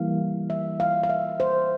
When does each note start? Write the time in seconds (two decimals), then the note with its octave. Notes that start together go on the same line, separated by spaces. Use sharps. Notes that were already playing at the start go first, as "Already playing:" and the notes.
Already playing: E3 G3 A#3 E4 F5
0.50 E5
0.80 F5
1.03 F5
1.10 E5
1.40 C5